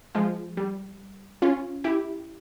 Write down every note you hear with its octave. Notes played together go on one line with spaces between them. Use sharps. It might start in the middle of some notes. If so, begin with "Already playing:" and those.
F3 G#3
G3
C#4 F4
E4 G4